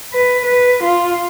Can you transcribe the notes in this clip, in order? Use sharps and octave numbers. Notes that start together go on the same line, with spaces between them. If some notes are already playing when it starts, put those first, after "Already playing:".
B4
B4
F4